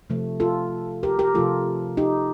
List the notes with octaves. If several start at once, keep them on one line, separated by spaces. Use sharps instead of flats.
C3 F3 A3
F4 A4
G4 A#4
G4 A#4
C3 F3 A3 F4 A4
D#4 G4